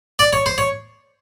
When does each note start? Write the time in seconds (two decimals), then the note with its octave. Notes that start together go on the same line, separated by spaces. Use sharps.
0.19 D5
0.33 C#5
0.46 C5
0.58 C#5